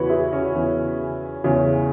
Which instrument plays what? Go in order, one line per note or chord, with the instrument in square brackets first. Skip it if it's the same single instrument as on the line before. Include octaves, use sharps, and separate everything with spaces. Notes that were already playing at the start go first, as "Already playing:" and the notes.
Already playing: [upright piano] E2 C#3 E3 F#4 B4 C#5
E4 G#4
C#4 F#4
E2 C#3 E3
E2 C#3 E3